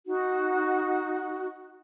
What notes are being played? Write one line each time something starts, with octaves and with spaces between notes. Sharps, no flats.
D#4 F#4